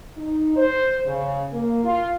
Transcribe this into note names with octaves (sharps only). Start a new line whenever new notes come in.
D#4
C5
C#3
A#3
F4